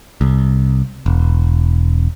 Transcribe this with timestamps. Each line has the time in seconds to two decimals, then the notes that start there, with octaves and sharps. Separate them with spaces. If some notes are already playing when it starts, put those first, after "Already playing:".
0.21 C2
1.06 E1